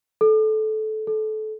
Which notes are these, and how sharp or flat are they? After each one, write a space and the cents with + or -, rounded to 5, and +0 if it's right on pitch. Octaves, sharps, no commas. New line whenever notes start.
A4 -20
A4 -25